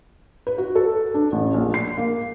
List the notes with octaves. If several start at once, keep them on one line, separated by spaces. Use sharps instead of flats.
B4
F#4
A4
D4
A1
A#1
C7
A#3